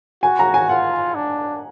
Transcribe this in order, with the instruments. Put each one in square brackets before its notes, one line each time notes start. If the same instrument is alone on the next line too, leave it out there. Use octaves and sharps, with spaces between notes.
[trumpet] F#4 [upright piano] G#5
[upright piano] A#5
G#5
[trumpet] F4 [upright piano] F#5
[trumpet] D4